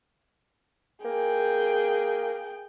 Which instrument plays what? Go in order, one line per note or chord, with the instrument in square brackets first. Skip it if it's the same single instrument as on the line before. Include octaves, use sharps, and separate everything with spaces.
[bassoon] A#3 [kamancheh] G#4 G5